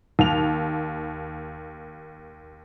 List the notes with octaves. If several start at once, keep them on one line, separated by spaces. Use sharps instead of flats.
D#2 F7